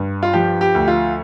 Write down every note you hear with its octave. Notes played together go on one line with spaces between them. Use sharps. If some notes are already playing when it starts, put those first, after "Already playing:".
Already playing: G2
F4
F3 G4
G4
D2
F4